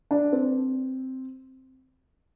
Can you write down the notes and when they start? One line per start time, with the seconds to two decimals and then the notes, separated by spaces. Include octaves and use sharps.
0.11 D4
0.32 C4